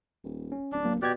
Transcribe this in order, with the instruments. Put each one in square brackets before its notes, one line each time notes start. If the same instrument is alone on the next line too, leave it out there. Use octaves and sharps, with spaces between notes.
[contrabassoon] D#1
[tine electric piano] C#4
[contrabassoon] D1 [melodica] D4
[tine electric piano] F#3 A#3
[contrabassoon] B2 [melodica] G4 D5 [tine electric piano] F#6 G#6